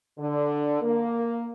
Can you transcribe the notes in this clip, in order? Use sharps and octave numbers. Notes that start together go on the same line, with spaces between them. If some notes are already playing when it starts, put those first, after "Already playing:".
D3
A#3